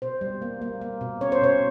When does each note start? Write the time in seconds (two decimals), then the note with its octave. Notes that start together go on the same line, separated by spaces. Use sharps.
0.02 B2 C5
0.21 G3
0.42 A#3
0.62 A#3
0.81 A#3
1.01 B2
1.21 C#4 C#5
1.32 C5
1.41 B2 C#5